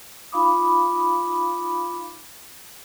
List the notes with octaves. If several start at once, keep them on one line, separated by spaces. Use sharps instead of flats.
D#4 F4 F5 B5 D6 D#6